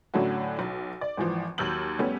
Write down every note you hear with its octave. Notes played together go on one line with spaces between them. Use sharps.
A2 D3 F#3 C#4 E4 F#4
B1
D5
G#1 E3 F3
D#2 F#3 E6 F6 G6 F#7
G3 A3 B3 C#4 G4